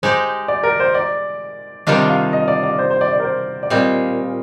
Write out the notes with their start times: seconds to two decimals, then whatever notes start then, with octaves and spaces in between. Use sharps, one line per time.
0.03 G#3 D#4 G4 C5
0.48 D5
0.63 A#4
0.80 C5
0.95 D5
1.87 C3 D#3 G3 D4 F4 D#5
2.09 F5
2.33 D#5
2.48 D5
2.63 D5
2.78 C5
2.90 C5
3.01 D5
3.13 D5
3.20 A#4
3.24 C5
3.63 D5
3.70 A#2 G3 C4 D#5